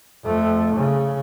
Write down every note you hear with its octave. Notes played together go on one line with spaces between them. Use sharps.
F2 A3
C#3